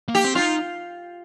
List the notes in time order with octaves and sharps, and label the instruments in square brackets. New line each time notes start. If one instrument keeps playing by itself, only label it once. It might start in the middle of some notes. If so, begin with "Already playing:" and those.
[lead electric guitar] A#3
[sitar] G4
[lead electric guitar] C4
[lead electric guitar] D#4 [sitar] F4